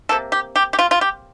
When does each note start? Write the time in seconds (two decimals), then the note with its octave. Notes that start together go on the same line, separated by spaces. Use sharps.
0.09 C3 F3 A#3 A4
0.32 G4
0.56 G4
0.73 G4
0.79 F4
0.91 F4
1.01 G4